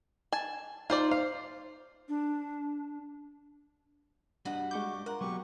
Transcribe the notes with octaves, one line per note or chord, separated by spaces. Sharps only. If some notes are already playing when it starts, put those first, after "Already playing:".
G#5 A5
D#4 F4 C5 D5
C5 F5
D4
G3 D4 F#4 B4 D#5 F#5
G#3 C#6 D6 G6
F4 A#4 F#5 A#5
F#3 G#3 B3 G4 C#6